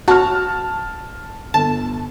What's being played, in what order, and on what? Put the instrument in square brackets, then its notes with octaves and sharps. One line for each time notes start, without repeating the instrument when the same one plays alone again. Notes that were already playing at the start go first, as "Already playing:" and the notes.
[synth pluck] F#4 [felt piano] A5 F6
[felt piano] G1 [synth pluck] A5